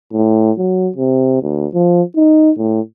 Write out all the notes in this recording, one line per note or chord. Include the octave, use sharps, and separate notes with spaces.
A2
F#3
C3
D2
F3
D#4
A2